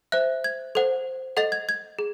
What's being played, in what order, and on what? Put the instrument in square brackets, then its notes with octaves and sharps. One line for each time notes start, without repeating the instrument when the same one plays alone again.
[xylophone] C5 E5 F#6
G#6
A4 C5 F#5
A4 D#5 F#5 A6
G#6
G#6
G#4